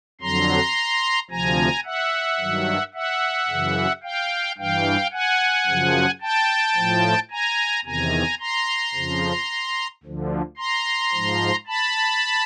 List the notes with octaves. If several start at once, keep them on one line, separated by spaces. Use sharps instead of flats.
F2 D3 F#3 A#5 C6
D2 C3 F3 G#5 A#5
E5 F#5
G2 D#3 F#3
E5 F#5
F#2 C#3 E3
F5 G5
G2 E3 F5 G5
F#5 G#5
F#2 C#3 F3
G5 A5
A2 F3
G#5 A#5
E2 C3 D#3 G#5 A#5
A#5 C6
F2 C#3 F3
D2 D3 F3
A#5 C6
G#2 F3
A5 B5